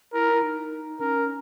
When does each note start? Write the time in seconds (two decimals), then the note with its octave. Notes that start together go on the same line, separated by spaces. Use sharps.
0.13 E4 A#4
0.33 E4
0.43 D#4
1.00 C#4 A#4